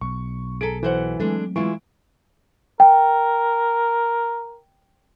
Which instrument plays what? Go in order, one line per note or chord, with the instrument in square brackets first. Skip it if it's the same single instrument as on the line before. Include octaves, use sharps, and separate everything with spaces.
[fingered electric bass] B1 [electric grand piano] C#6
[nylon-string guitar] G#4 A4 [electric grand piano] A#5 B6 D7
[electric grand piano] E3 [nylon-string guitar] F#4 C5 F#5
[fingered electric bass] F#3 A3 C4 [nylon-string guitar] G#3 D4 A4
[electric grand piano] E3 C#6 D7 [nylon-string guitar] G#3 E4 F4
[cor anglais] A#4 [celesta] G5